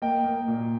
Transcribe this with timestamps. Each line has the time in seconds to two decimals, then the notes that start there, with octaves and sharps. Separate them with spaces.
0.02 A#3 D#5 G5
0.24 A#3
0.48 A#2